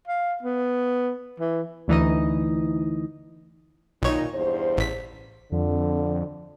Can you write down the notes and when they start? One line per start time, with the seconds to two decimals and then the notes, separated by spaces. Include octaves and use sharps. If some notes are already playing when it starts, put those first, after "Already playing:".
0.07 F5
0.43 B3
1.40 E3
1.88 D2 E3 D#4 D#5
4.02 B1 A#2 D#3 D#4 C#5
4.34 E2 G2 C5
4.77 A1 B6
5.52 F2 D3